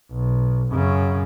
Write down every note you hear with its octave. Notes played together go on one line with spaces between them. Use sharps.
B1
F#2 C#3